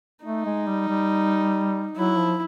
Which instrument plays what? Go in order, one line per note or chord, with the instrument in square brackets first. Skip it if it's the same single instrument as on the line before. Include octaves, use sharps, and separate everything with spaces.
[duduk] A3 [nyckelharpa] D#4
[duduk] G#3
G3
G3
[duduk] F#3 [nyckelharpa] E4
[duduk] F3